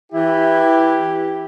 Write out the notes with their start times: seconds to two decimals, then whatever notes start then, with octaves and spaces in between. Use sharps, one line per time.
0.12 E3 E4 G4